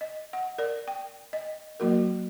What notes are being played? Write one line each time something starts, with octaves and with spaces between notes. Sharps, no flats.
D#5
F#5
A#4 D5
G5
D#5
F#3 A#3 F#4 A#4